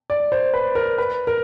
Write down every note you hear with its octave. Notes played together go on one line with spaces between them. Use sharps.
D5
C5
B4
A#4
B4
A#4